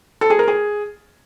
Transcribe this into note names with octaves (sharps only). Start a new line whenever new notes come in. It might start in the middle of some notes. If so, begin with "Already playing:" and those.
A4
G#4
A#4
G#4